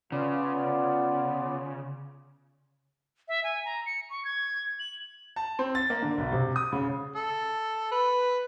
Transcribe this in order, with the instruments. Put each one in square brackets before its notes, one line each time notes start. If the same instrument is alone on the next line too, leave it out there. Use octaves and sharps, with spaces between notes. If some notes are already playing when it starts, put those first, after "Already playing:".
[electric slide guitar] C#3 [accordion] B3 F4 D5
[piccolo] E5
G#5
A#5
C#7
C#6
G#6
F#7
[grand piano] A5
C4
A6
A#3
D3
B1
C3
D#6
C#3
[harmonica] A4
B4